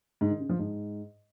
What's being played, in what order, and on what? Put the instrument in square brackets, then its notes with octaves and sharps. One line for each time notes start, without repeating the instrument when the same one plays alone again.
[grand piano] G#2
D#3
C#3
F3
G#2